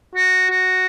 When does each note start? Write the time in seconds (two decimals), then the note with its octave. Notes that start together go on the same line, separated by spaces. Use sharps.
0.15 F#4
0.50 F#4